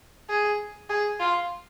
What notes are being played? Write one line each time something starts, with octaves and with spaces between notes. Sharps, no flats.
G#4
G#4
F4